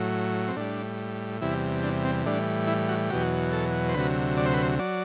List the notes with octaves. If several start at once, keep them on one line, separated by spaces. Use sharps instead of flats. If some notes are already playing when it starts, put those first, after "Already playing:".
Already playing: A2 F#3
C4
A2 G3 D4
E2 C3 G3 E4
D4
C4
A2 E3 G3 D4
E4
F#4
E2 B2 F#3 G4
A4
C5
D2 C3 F#3 B4
D5
C5
B4
C5
F#3 D5